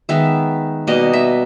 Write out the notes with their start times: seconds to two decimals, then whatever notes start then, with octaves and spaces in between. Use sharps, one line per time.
0.09 D#3 G#3 B3 E5
0.87 B2 G3 A#3 D#5
1.13 E5